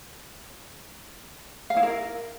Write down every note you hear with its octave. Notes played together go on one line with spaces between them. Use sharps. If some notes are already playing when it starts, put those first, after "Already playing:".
F5
E4
A#4